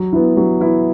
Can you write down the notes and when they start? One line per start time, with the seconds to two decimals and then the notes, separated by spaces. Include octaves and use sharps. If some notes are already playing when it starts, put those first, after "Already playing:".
Already playing: F#3
0.13 B3 E4
0.37 F#3
0.61 B3 E4